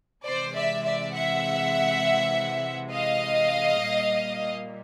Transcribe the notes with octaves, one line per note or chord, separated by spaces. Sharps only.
C3 E3 G#3 C5 D5
D5 E5
D5 E5
E5 F#5
D#5 F5
A#2 G3 A#3